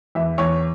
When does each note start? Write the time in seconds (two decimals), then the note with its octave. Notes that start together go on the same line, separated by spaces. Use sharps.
0.15 E2 E5
0.38 E2 C#5